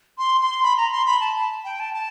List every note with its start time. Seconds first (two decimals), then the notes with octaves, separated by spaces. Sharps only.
0.18 C6
0.41 C6
0.63 B5
0.77 A#5
0.92 C6
1.06 B5
1.20 A5
1.36 A5
1.64 G5
1.80 A5
1.94 A5